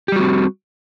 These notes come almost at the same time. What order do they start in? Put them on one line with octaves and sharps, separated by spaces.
G4 G3 F#4 C4